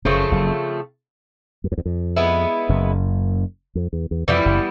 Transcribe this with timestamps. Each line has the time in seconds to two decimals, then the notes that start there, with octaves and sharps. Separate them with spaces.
0.05 F#1 F#2 C#3 F3 A3 C4
0.32 F#1 F#2
1.64 F#2
1.72 F2
1.78 E2
1.86 F2
2.17 G#3 B3 E4
2.69 F#1 F#2
3.75 F2
3.93 E2
4.11 E2
4.28 F2 E3 G3 B3 E4
4.46 F#1 F#2